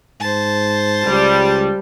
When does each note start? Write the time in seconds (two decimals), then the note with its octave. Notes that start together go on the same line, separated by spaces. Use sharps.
0.20 G#2 C5 A5
1.06 C#2 G3